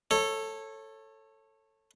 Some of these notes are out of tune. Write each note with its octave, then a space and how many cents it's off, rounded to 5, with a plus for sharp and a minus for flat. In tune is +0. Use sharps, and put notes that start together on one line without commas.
A4 +10 C#5 -20